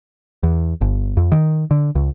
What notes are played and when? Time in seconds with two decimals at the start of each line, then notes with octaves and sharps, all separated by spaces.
0.43 E2
0.81 G1
1.17 F2
1.32 D#3
1.71 D3
1.95 C#2